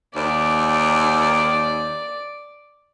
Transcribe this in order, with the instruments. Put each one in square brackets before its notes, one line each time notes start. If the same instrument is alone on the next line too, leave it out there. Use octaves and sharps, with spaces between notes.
[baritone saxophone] D#2 [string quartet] D5